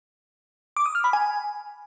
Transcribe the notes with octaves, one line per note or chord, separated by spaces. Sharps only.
D6
D#6
F6
B5
G#5